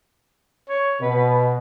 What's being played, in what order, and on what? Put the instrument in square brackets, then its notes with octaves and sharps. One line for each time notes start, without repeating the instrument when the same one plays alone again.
[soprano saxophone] C#5
[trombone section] B2 [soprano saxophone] B4